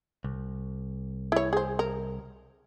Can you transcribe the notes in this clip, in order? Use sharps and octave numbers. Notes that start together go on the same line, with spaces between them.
C2
E4 C#5
G#4 C5
A#4